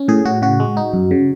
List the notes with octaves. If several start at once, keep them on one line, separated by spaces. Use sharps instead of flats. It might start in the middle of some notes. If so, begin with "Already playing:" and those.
Already playing: C#4
A2 G#4
A2 F#4
C#3 F#4
G#3
D#4
F#2
C#3